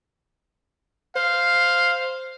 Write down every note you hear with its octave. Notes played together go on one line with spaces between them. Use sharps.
C5 F5